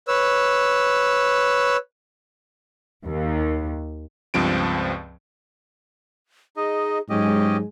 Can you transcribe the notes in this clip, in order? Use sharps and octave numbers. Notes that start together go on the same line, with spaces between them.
B4 C#5 E6
D#2
C#2 G2 F3 C4 D7
D#4 G#4 D#5
G#2 F#3 G#3 C#4 G4 D#5